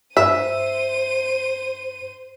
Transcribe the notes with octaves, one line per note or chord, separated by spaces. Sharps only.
G2 C5 E5 D#7